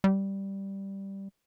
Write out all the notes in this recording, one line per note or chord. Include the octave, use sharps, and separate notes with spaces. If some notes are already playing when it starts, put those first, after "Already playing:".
G3